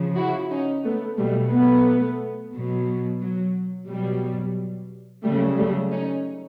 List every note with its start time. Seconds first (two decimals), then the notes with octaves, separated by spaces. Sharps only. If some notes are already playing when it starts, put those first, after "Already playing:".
Already playing: C#3 F3
0.16 E4 F#4
0.51 C#4 D#4
0.85 A3 B3
1.18 B2 F#3 G3 A3
1.52 A3 B3
2.53 B2 F#3
3.21 F#3
3.89 B2 F#3 G3
5.24 C#3 F#3 G3 A3
5.57 G3 A3
5.92 C#4 D#4